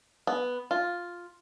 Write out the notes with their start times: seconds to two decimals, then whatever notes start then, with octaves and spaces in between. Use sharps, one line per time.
0.27 B3
0.71 F4